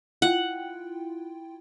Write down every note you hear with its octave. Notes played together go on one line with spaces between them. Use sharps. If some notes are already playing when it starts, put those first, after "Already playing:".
E4 F4 F#5 G5